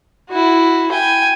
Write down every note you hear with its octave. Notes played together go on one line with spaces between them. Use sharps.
E4 F#4
G5 G#5